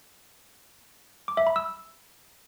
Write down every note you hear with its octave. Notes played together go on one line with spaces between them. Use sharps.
D6
E5
B5
E6